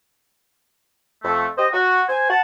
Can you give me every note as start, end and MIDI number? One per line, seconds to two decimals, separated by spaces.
1.24 1.47 41
1.24 1.47 57
1.58 1.67 67
1.58 1.67 72
1.58 1.67 75
1.73 2.03 66
2.07 2.27 72
2.07 2.27 80
2.30 2.41 78
2.30 2.41 81